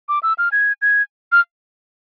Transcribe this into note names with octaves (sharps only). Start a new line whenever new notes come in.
D6
E6
F6
G#6
G#6
F6